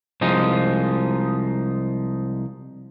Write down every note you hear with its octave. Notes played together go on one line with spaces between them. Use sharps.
C2 F3 G#3 D#4